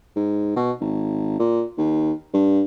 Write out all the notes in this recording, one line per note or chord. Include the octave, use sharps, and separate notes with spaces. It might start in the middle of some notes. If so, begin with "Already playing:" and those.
G#2
B2
G#1
A#2
D#2
G2